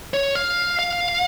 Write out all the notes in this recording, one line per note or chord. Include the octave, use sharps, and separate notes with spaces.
C#5
F5
F5